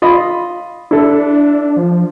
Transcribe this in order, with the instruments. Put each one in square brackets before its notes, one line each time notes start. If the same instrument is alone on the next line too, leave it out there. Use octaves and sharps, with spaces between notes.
[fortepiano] F4 D#5 B5
[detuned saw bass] D4 [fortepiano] E4 A4
[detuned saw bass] F3